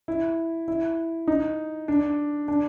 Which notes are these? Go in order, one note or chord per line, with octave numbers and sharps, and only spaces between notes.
E4
E4
D#4
D4
D4